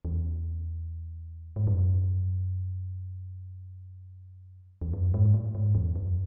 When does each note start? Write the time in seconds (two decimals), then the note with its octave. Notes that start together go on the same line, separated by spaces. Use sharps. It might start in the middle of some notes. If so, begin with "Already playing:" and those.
0.05 E2
1.56 G#2
1.67 F#2
4.81 E2
4.93 F#2
5.14 G#2
5.34 A2
5.55 G#2
5.75 E2
5.96 F#2